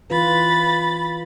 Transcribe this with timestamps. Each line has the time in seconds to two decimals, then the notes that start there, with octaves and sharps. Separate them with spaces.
0.10 E3 F4 B4 B5 A6